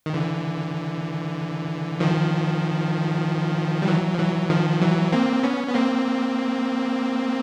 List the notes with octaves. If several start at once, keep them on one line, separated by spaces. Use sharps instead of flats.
D#3
D3 E3
D#3 F3
G3
E3 F#3
F3
E3 F#3
D#3 F3
E3 F#3
A#3 C4
B3 C#4
B3
A#3 C4